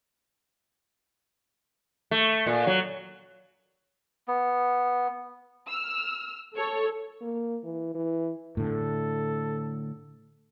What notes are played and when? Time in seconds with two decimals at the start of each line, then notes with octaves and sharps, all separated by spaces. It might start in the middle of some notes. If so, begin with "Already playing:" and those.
2.11 A3
2.46 A#2
2.67 F#3
4.28 B3
5.66 E6 F6
6.56 A4 C#5
7.22 A#3
7.64 E3
7.95 E3
8.57 A2 D3 A4